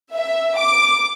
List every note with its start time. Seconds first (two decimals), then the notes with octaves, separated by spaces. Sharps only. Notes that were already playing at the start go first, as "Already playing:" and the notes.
0.14 E5
0.59 D6